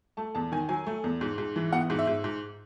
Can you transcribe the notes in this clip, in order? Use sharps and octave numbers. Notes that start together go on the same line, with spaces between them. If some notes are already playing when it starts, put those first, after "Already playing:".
A3 A5
E2 A5
D#3 G#5
F#3 G#5
A3
E2
G#2
G#2
E3
B3 F#5
G#2
E5
G#2
G#2